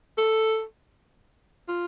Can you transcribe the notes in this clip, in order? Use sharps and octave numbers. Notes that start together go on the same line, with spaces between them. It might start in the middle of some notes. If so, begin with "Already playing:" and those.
A4
F4